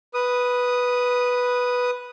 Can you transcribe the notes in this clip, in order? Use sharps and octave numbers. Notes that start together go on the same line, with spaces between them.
B4 D#6